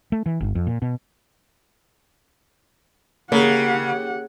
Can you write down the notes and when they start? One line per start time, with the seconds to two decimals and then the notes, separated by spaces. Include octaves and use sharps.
0.12 A3
0.26 E3
0.41 G1
0.55 F2
0.67 A#2
0.82 B2
3.32 C#3 A#3 G4 F#5